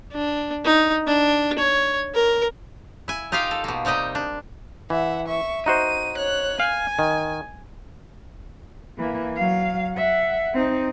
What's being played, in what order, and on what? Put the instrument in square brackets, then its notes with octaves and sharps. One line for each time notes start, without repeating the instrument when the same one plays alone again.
[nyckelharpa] D4
D#4
D4
C#5
A#4
[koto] E4 G#5
D#4 F4 G4 A#4 F5 G5
A4
B2 A#3
C3 G3 D#4 D#5 G5
D4
[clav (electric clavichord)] E3 [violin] E5 F#5
[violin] E5 C#6
[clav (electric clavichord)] D#4 F#4 C5 [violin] D#7
[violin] C#5 F#6
[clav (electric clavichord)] F5 [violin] G#5
[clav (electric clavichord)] D#3
[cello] E3 A#3
F#3 F5
E5 F#5
C4 D#4